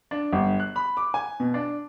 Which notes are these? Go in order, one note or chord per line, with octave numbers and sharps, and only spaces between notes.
D4
G1
F#6
B5
D6
G#5
B2
D4